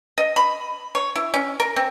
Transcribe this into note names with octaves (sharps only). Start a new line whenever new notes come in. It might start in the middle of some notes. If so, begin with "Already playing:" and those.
D#5
B5
C#5
E4
C#4
A#4
C4